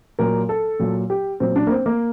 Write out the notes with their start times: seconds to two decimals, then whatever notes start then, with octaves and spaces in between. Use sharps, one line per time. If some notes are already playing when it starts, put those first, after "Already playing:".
0.19 A#2 F#3 A#4
0.49 A4
0.79 A#2 F#3
1.10 G4
1.40 A#2 F#3 C4
1.56 D4
1.67 A#3
1.71 C4
1.86 A#3